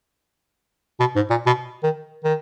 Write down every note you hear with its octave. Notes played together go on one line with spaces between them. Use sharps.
B2
G#2
A#2
B2
D#3
D#3